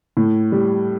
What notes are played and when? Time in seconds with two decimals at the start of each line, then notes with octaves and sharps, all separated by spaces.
0.17 A2
0.52 G3